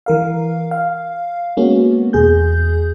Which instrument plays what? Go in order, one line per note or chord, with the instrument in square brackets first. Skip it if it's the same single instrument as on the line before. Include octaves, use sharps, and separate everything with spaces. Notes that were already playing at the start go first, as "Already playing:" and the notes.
[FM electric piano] E3 A#4 F5
F5
G#3 A#3 B3 C#4 F#4
E2 B2 G#4 G6